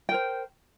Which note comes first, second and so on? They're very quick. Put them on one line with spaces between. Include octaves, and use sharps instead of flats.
G5 A#4 C5